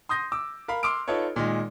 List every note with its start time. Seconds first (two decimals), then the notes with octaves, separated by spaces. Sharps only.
0.09 C6 D#6 G6 A#6
0.32 D6 E6
0.68 A#4 F5 B5
0.83 C6 D6 E6 F6 D7
1.08 D#4 F4 A4 B4 C#5
1.36 A#2 D#3 G#3